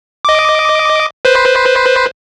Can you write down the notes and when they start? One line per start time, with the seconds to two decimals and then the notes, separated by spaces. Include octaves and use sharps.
0.25 D#5 D6
1.25 B4 C5